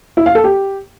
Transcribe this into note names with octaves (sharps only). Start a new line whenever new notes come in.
E4
F5
A4
G4